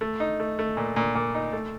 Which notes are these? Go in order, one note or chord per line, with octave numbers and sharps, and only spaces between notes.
A3
D#4
A3
A3
A#2
A#2
A#2
D#4
A3